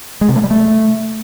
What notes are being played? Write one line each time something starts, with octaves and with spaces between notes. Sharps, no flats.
G#3
C3
A3
G3
A3